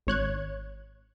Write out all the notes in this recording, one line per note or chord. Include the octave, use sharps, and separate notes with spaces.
G#1 C#5 F#6 G#6